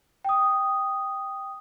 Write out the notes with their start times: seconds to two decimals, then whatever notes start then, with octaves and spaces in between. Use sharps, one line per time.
0.25 G5 D#6